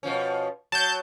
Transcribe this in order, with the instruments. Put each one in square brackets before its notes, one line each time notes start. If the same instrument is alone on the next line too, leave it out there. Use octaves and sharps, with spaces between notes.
[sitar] B2 F3 C#4
[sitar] F#3 [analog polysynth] A5 G6